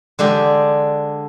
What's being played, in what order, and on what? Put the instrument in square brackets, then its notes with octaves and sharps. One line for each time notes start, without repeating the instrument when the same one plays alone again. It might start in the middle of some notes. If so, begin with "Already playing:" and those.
[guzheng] D3 G#3 D4 G4